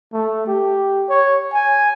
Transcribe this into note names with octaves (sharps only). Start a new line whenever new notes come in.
A3
G4
C#5
G#5